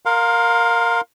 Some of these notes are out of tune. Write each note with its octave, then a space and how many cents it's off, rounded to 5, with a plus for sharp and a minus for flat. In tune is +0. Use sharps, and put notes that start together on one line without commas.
A#4 -5 F5 +20 C6 +0